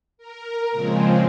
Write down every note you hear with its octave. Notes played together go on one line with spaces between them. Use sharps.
A#4
A#2 C#3 F3 G#3 C4